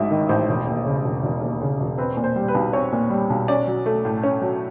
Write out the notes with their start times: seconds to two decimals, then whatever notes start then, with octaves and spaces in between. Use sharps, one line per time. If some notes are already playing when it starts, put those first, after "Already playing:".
Already playing: A1 G#2 F#3 E5
0.11 D#3 D#5
0.29 A1 C5
0.49 E1
0.67 D#2
0.86 C#3
1.04 E1
1.23 E1
1.42 D#2
1.61 C#3
1.80 E1
1.98 C4 B4
2.17 A#2
2.24 C5
2.36 G3
2.48 B4
2.54 B1
2.73 C4 C#5
2.92 A#2
3.10 G3
3.30 B1
3.48 C#4 D5
3.67 F#3
3.86 A3
4.05 A2
4.23 C#4
4.42 F#3